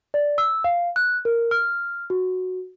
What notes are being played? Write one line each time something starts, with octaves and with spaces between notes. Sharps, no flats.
D5
E6
F5
F#6
A#4
F6
F#4